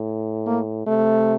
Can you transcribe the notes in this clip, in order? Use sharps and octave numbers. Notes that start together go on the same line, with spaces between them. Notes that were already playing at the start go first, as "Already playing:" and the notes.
Already playing: A2
A#3
C3 A3